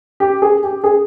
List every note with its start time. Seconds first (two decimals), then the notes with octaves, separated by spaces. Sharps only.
0.20 G4
0.42 G#4
0.63 G4
0.84 G#4